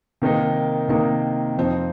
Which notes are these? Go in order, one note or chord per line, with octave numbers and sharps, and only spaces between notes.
C3 D#3 A#3 D#4 A#4
C3 D#3 A#3 D#4 A#4
F2 F3 C4 D#4